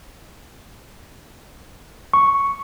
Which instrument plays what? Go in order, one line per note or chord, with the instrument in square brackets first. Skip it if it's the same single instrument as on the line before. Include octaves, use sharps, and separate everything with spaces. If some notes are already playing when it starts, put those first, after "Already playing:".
[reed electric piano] C#6